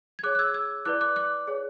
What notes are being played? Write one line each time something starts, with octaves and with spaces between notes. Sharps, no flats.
G#6
G#4 C#5 D6 F#6
F#6
E6 G#6
E6 G#6
E4 B4 D5 D6 F#6
D6 F#6
D6 F#6
G#4 C#5